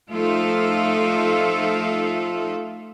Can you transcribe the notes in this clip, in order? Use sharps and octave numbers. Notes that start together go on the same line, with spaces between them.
F3 A3 D#4 F4 A4 E5